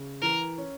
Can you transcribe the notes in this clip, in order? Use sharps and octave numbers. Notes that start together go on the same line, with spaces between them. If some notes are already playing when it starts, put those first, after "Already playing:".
Already playing: C#3
E3 A#4
C#4